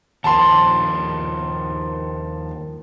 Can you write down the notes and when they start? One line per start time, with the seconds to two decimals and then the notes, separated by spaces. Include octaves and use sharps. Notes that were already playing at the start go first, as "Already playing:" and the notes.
0.24 D#2 F3 A5 C6